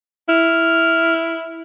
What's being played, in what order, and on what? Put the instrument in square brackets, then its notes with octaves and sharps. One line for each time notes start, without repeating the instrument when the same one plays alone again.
[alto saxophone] E4 [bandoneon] F6